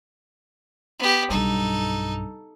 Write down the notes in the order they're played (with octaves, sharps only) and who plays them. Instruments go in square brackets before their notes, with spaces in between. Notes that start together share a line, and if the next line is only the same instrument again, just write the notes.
[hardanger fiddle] B3 G4
[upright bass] B1 G2 [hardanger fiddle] D#4 A4